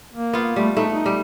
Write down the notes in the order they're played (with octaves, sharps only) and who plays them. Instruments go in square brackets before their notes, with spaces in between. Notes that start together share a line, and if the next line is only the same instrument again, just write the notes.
[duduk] A#3
[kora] B3 F4
[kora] G3 [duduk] A3
[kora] A3 [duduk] D#4
[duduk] D#4
[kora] G3